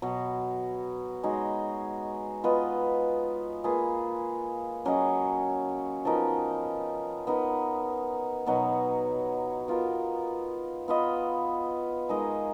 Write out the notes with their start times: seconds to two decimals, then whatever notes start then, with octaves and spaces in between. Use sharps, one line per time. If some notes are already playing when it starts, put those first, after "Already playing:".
0.02 B2 F#3 B3
1.23 G#3 D#4 F#4 C#5
2.44 B3 F4 B4 D#5
3.64 A#3 F4 G#4 B4
4.85 F#3 C#4 G#4 D#5
6.05 F3 B3 D#4 A#4
7.27 B3 D#4 A#4
8.46 B2 F#3 B3 D#4
9.68 B3 F4 A#4
10.88 B3 F4 B4 D#5
12.09 G#3 D#4 A#4 D#5